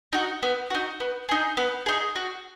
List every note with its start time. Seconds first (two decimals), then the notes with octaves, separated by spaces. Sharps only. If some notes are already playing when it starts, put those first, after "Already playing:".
0.13 D#4 F#4
0.43 B3
0.70 D#4 F#4
1.00 B3
1.29 D#4 G#4
1.57 B3
1.86 D#4 G#4
2.16 F#4